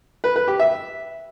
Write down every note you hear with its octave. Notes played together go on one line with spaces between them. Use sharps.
B4
B4
G4
E5